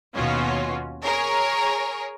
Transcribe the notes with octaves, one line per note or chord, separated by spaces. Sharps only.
D#2 B2 C#4 F4 F#4
G#4 A#4 C#5